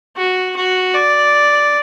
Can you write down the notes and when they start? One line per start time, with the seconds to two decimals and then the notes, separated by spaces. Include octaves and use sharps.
0.16 F#4
0.56 F#4
0.95 D5